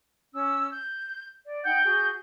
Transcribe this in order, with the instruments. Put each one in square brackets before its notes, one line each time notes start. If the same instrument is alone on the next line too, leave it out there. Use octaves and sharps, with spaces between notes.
[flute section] C#4 E6
G6
D5
[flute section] D#4 F#5 G5 [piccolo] G6
[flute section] F#4 G#4